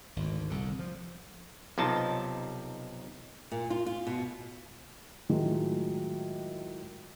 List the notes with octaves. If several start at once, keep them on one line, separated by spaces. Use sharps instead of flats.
G#1 D2
C2 D3
F3
B1 C3 F3 D#4 A5
A#2
F4
F4
B2
A2 D#3 F#3 G#3 F4